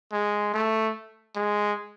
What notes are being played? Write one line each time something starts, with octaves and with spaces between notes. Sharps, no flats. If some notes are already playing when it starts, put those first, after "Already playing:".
G#3
A3
G#3